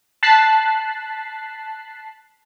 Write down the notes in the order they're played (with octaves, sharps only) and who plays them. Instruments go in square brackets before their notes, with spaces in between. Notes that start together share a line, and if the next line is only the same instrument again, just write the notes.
[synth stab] A5 F#6 B6 C7